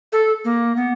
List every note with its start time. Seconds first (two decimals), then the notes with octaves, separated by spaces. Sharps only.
0.13 A4
0.45 A#3
0.76 B3